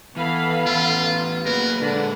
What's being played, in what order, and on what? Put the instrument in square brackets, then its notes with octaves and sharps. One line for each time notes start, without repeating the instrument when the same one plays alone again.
[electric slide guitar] E3 [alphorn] B3 [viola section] A4 F5 B5
[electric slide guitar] A2 E3 [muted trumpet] F4
[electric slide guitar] F#3 A#3 G#4 [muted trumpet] A#4 [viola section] B4
[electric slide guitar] A#2 G#3 [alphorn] D3 [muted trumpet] D4